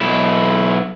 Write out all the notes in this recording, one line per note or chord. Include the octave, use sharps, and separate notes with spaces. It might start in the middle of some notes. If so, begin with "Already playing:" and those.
B1 E4